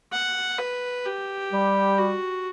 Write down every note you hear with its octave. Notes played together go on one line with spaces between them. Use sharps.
F#5
B4
G4
G3
F#4